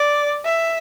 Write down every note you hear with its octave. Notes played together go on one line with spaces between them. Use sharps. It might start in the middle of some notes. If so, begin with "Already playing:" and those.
Already playing: D5
E5